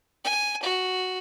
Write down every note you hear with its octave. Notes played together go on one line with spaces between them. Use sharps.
G#5
F#4